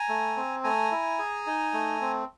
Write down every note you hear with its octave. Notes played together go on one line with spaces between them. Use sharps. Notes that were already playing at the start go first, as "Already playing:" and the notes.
Already playing: G#5 A#5
A3
C4
A3 G#5 A#5
E4
G#4
D#4
A3
C4